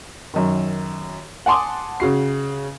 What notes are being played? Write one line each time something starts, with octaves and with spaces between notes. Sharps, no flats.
F#2 D#3
F#5 G#5 A5 C6 D6 D#6
C#3 F#4 C7